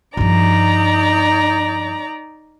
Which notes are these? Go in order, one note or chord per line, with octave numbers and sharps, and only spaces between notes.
G2 F3 D#4 D5 A#5